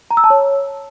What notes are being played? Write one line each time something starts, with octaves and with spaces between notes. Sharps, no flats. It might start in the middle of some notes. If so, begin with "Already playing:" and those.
A#5
E6
A5
C#5